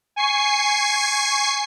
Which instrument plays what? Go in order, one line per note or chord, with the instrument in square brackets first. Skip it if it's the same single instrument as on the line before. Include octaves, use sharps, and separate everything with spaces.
[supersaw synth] G#5 C#6 C7